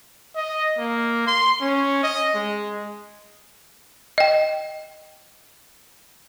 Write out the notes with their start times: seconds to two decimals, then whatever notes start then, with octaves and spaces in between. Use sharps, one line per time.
0.35 D#5
0.78 A#3
1.27 C6
1.61 C#4
2.03 D#5
2.35 G#3
4.18 D#5 G5